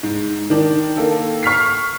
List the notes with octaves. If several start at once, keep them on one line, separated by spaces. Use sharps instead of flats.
G#2
D#3 D4
D#3 A#3 A4
C#6 F6 B6 C7